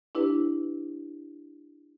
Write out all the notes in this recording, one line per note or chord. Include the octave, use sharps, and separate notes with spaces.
D4 E4 G4 B4